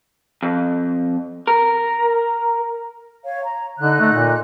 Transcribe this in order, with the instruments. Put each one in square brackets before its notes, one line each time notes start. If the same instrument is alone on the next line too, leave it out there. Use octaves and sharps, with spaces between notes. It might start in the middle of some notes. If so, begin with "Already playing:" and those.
[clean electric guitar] F2
A#4
[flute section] C#5 F5
A#5
[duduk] D3 [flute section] D#4 F#6
[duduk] A3
A#2